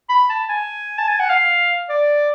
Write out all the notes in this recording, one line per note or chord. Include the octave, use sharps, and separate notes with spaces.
B5
A5
G#5
A5
G#5
F#5
F5
D5